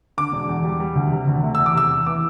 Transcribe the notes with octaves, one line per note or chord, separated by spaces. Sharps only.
D3 D6
E1
E2
G3
G3
D2
C3
D2
A3
E2 E6
D6
C3 E6
E2
E3 D6